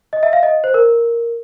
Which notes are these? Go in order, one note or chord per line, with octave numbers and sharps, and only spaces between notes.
D#5
E5
F5
D#5
C5
A#4